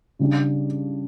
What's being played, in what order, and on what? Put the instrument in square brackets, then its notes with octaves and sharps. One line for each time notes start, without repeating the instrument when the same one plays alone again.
[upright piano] C#3 G3 D4